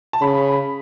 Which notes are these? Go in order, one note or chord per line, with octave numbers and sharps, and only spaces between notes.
A5
C#3 B5